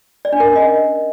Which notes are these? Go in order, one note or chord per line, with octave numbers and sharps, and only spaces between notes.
D5
D4
A#4
C#4
D#5